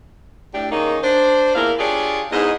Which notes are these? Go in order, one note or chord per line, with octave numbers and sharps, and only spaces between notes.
A2 D4 G4
D#3 G#3 A#3 C#4 D#4
D4 C5
E2 A#2 A#3 E4 A#4 F5
D4 F4 G4 G#4 C#5 D5
E2 G#2 D#4 D#5